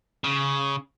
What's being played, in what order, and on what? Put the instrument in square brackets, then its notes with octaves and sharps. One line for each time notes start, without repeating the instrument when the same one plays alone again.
[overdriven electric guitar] C#3